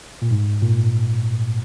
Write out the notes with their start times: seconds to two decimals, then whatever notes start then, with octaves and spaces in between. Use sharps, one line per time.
0.22 A#2
0.31 G#2
0.62 A#2